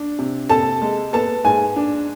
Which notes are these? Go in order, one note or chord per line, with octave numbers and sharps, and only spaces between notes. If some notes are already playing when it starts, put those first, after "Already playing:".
Already playing: D4
C3
C3 A4 A5
G#3
B3 A4 A5
G#2 G#5
D4